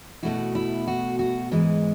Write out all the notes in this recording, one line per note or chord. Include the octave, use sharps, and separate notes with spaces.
B2 A3 E4 F#4
E4
F#4
F#4
G#2 E3 G#3